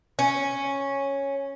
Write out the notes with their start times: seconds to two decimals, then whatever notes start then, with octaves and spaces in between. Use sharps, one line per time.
0.19 C#4